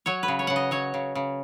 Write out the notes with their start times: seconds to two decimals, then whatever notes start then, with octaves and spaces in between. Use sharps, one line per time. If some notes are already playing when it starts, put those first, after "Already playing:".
0.06 F#3 C#5
0.23 B4
0.28 C#3
0.39 C#5
0.47 C#3 F#5
0.56 D#5
0.71 F#3 C#5
0.94 C#3
1.15 C#3